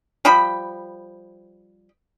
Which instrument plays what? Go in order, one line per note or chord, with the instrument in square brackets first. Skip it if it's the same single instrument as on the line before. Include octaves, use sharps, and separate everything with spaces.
[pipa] F3 G3 G5 B5